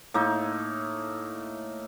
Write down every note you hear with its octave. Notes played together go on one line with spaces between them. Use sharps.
A2 A#3 D#4